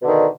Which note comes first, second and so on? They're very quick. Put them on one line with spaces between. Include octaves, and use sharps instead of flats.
B2 D3 D#3